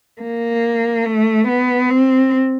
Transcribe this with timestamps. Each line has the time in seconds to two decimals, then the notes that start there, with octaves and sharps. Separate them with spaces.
0.22 A#3
1.06 A3
1.48 B3
1.90 C4